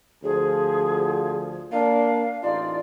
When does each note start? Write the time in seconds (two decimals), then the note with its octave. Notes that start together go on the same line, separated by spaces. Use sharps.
0.24 D2 F3 G#4
1.72 A#3 D4 F5
2.42 A1 D#4 F4 D5